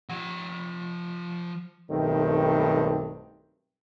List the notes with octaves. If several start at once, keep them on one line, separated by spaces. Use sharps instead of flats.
F3 F#5
B1 G2 D#3 G3 A3 C4